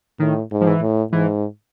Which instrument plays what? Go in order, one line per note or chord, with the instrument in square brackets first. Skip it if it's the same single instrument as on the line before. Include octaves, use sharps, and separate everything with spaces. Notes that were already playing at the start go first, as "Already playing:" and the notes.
[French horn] A2 [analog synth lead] D#3
[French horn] G#2
[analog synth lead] F3
E3
[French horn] A2
[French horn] G#2 [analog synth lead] E3